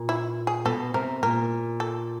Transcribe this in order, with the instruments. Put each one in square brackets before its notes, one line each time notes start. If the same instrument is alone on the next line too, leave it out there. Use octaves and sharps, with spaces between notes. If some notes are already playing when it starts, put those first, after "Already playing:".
Already playing: [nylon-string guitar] A#2
[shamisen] E4
G#4
[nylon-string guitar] B2 [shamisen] A4
[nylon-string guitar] C3 [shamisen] A#4
[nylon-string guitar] A#2 [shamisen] A#4
[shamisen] A4